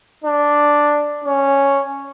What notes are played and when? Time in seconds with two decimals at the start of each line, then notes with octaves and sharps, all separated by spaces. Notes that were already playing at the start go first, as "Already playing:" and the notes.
0.24 D4
1.24 C#4